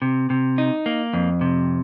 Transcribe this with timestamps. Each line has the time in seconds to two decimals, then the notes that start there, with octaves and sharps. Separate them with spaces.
0.02 C3
0.30 C3
0.58 D#4
0.86 A#3
1.13 F2
1.41 C3